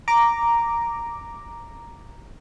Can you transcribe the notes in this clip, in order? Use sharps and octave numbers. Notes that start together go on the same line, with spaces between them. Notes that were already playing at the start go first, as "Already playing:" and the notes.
A#5 D6